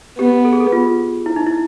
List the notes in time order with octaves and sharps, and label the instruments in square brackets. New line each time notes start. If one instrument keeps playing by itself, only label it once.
[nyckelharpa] B3 [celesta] G4
[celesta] A4
G#4
A4
F4
E4
D#4
E4